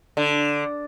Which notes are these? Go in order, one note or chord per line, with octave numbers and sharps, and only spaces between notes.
D3